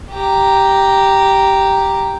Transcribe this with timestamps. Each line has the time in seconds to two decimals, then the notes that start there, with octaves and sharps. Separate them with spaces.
0.12 G4 A#5